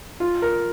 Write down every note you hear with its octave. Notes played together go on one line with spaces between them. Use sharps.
F4
A#4